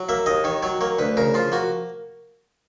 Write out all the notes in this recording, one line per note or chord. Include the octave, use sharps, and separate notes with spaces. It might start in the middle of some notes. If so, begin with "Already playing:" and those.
Already playing: F#3
A#3 E5
D#2 D#5
D#3 C#5
F#3 C#5
A#3 C#5
D2 B4
C#3 A#4
F3 F4
A#3 F#4